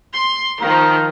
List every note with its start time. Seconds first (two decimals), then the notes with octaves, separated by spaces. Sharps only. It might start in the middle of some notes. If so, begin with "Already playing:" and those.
0.12 C6
0.61 D#3 F3 F5 A#5